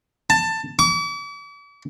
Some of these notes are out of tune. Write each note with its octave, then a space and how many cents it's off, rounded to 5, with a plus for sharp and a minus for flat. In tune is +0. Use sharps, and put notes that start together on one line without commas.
A5 +15
D6 -45